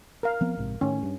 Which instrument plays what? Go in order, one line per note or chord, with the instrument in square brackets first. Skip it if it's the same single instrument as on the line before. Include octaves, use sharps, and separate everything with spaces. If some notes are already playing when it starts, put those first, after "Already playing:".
[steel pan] A#4 F5
[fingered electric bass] F3 B3 C4
A#1 G#2 C3
[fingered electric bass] A2 D#3 [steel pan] C#4
[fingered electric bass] G2